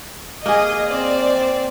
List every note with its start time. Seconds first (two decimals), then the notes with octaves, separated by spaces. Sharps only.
0.46 A#3 G#4 D#5
0.89 C4 D5